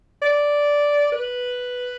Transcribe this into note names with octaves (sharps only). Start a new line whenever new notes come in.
D5
B4